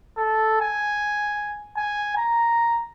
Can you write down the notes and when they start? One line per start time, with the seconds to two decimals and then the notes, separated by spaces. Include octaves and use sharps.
0.17 A4
0.61 G#5
1.77 G#5
2.17 A#5